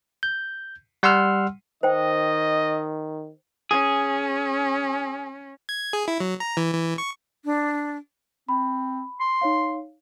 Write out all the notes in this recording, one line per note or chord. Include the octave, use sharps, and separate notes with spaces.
G6
G3 F#5 C6 E6 F6
D#3 C5 D#5 G5
C#4 G#4
G#6
G#4
E4
F#3
A#5
E3
E3
C#6
D4
C4 B5
C6
D#4 C#5 F5